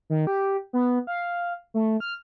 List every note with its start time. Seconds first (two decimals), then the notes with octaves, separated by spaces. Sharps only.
0.10 D#3
0.27 G4
0.73 B3
1.07 F5
1.74 A3
2.00 F6